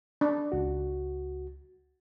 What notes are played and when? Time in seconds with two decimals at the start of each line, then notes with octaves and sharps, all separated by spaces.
0.21 D4
0.52 C#2 F#4